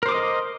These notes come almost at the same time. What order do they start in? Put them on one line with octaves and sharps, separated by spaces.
A#4 C5 D6 D#6 D#5